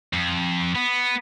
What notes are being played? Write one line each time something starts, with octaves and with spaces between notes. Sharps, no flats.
F2
B3